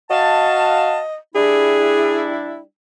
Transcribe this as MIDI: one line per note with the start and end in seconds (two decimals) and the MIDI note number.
0.11 1.00 66
0.11 1.16 75
0.11 1.00 77
0.11 1.00 81
1.35 2.61 55
1.35 2.61 62
1.35 2.61 64
1.35 2.30 68